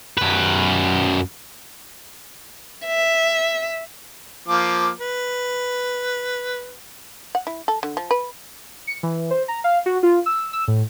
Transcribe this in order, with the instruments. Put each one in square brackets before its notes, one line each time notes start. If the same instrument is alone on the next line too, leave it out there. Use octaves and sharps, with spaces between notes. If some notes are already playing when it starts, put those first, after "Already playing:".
[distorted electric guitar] F#2 B4
[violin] E5
[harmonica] F3 A#3 D6
B4
[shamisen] F#5
E4
A4
D3
F3
B4
[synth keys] C#7
E3
C5
A#5
F5
F#4
F4
E6
E6
A2